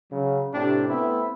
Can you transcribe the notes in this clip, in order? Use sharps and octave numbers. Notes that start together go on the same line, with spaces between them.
C#3 F#3
A2 C3 D4 G4
A3 B3 C4 E4